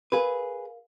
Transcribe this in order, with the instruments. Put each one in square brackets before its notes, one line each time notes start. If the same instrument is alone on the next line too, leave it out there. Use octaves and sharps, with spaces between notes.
[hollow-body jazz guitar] G#4 B4 [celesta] A#4 F5